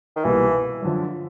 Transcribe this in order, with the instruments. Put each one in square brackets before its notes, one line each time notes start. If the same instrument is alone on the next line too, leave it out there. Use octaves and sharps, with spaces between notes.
[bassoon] D#3
[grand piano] C2 B2 G3 A#3 [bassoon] E3
[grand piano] F#2 D3 F3